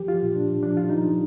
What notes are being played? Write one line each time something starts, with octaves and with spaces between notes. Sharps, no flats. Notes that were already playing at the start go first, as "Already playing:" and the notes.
Already playing: F3 G4
F4
A#2
D4
F3 D4
F4
D#4
F3